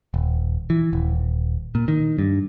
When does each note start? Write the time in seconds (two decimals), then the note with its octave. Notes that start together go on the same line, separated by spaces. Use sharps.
0.14 D#1
0.70 E3
0.93 D#1
1.75 A#2
1.88 D#3
2.19 G2